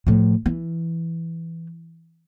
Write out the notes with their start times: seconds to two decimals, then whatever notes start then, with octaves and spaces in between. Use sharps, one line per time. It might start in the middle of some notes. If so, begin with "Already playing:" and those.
0.07 A2 F3
0.46 E3